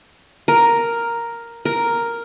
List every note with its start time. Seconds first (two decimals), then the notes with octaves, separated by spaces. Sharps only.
0.48 A#4
1.65 A#4